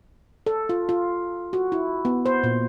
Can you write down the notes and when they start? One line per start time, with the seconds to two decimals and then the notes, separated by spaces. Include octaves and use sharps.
0.46 A4
0.69 F4
0.89 F4
1.53 F#4
1.72 E4
2.05 B3
2.26 C5
2.44 A#2